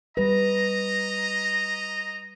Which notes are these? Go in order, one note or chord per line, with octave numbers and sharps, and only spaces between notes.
G3 B4 D#5 A#5